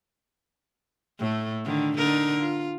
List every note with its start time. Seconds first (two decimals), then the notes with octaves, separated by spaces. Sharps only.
1.19 A2 A3
1.65 D3 D#3
1.97 D3 D#4 A#4
2.41 F4